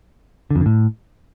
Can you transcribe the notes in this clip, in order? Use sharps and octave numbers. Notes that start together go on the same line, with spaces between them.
D3
F2
D3
A2